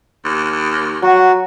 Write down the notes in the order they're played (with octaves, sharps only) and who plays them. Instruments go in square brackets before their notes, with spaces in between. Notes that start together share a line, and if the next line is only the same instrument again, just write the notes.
[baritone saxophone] D#2
[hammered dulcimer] F#3 [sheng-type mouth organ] F#4